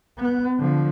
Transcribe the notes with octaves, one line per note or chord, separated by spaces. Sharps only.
B3
D3 F3